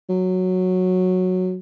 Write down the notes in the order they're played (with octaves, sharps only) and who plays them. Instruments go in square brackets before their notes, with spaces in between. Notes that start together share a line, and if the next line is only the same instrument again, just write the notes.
[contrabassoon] F#3